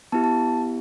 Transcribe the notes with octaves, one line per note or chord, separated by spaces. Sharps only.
B3 E4 G4 A5
A5